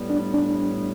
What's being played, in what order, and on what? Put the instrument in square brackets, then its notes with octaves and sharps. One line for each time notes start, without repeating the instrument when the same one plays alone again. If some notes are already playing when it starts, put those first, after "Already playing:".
Already playing: [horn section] A2 G3 B3
[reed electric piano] D4
D4